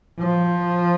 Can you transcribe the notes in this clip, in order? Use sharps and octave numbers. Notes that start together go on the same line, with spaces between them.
F3